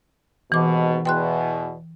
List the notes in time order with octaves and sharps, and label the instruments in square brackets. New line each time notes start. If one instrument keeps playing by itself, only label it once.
[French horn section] D#2 G#2 B2 [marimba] E3 D6
[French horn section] E2 B2 [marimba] G5 C6 F#6